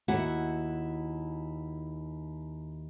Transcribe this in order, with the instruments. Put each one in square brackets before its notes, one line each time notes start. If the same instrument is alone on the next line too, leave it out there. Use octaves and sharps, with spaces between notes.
[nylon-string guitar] D#2 E4 F#4 F#5